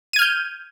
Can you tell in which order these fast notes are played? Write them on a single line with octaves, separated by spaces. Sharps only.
D#7 G#6 F6 G6